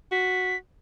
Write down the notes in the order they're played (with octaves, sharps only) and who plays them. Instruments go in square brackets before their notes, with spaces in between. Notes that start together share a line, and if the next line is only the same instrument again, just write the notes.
[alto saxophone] F#4 [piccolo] B6